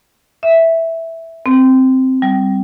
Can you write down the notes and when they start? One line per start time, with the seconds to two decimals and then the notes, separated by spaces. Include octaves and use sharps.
0.43 E5
1.46 C4
2.22 G3